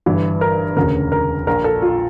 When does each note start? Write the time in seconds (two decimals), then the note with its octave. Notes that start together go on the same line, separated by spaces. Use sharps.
0.06 G1 G2 E3
0.41 A#4
0.76 E1 D2 C#3 A#4
1.12 A#4
1.47 A#1 A#2 A#4
1.64 A4
1.82 F4